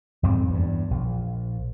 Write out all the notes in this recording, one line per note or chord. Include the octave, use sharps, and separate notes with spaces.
F2 G#2 G3 C4
E2 G2
A#1